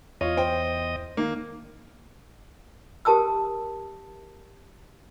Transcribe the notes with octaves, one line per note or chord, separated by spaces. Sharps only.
E2 F4 C#5 D#5
C5 G5
D#3 A#3
G4 A#4 A5 D#6 E6